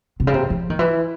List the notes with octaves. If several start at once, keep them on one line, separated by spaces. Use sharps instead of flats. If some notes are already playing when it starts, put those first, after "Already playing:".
C3
C#3
C3
F3
D#3
E3